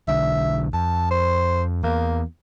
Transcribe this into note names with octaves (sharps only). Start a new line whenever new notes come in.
B1 D3 E5
F2 A5
C5
E2 A#3